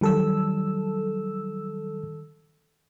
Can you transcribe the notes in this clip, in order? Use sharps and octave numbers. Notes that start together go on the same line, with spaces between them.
D#3 F#3 G3 A4 E6